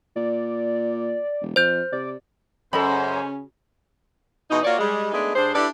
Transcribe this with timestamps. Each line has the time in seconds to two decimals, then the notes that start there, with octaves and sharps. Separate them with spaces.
0.16 A#2 D5
1.41 E1
1.56 F2 C5 G6
1.92 C3 D5
2.73 F#2 C#3 C#4 A4 C5 D#5 B5
4.50 B2 E3 G#3 D#4
4.64 A#3 F4 F#4 C#5 D5
4.78 G3 G#3
5.12 G#3 A3 B3 D4 D#4 G#4
5.35 G2 D4 G#4 C5
5.55 D4 E4 G4 A4 B4 D5